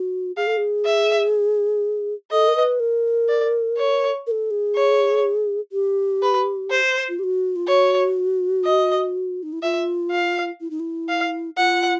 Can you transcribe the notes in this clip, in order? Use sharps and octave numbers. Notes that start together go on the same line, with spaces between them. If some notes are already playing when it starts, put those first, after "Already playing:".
Already playing: F#4
G#4 F5
A4
G#4
E5
A4 D#5
A#4
B4
A#4
D5
C#5
A#4
A4
G#4
C#5
G4
B4
C5
F4
G4
F#4
F4
F#4 C#5
D#5
D#4
E4
F4 E5
F5
E4
D#4
E4
F5
F4 F#5